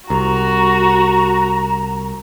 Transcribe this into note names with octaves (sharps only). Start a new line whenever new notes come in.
C2 F#4 A#5